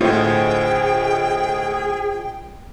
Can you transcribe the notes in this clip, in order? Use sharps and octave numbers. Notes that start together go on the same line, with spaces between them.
D2 A2 F4 G#4 C5 D#5 G5